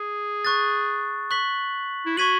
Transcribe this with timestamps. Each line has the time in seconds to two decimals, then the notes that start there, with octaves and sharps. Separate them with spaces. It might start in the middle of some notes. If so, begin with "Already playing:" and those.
Already playing: G#4
0.45 C#6 F#6 A6
1.31 C#6 F#6 B6 F#7
2.06 E4
2.17 F#4 C#6 G#6 B6 D#7 F#7